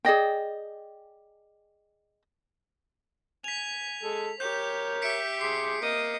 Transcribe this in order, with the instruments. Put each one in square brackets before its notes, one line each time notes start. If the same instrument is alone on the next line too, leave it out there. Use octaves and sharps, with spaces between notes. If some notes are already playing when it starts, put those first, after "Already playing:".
[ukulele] G#4 D5 D#5 G5
[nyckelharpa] G#5 [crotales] B6 F7
[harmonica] G#3 A4
[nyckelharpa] G4 [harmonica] A#4 C#5 [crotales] G6
[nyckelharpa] G4 E5 [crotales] B6 C#7 D7
[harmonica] G#4 C6 D6 [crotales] C7
[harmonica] A#3 [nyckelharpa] D#5 D#6